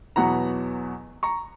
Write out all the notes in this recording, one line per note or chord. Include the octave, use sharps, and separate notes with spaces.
E2 B2 F#3 B3 F#5 A#5
A#5 C#6